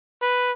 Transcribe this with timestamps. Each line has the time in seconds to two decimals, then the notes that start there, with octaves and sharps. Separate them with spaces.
0.22 B4